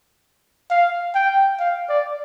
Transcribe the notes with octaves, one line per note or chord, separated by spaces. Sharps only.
F5
G5
F5
D5